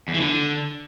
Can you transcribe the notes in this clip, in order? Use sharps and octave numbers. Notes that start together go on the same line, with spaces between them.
E2
E3
D3